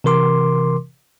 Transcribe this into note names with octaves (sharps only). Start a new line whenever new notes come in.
C3 E3 A#4 C6 D6